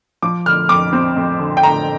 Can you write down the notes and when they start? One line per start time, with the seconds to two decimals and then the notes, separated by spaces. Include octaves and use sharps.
0.22 F3 D6
0.46 D3 F6
0.69 F2 D6
0.93 C4
1.16 F2
1.39 D3
1.57 G5
1.63 D3 A#5